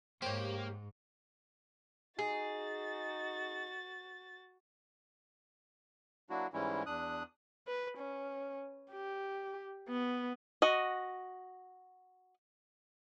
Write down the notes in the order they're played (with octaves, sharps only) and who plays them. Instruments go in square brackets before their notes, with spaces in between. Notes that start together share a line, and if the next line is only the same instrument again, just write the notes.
[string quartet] G#2 [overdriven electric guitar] A#3 [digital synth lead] G4 [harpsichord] C5 C#5
[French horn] D#4 [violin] F#4 A6 [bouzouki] G#4
[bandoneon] F#3 A#3 D4 E4 F#4
G#2 E3 G3 G#3 C#4 E4
E2 D4 D#6 F#6
[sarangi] B4
C#4
G4
B3
[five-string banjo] F#4 D#5